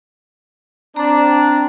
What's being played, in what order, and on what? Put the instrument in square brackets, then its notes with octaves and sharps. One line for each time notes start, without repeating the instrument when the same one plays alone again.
[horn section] C4 D4 [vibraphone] A#5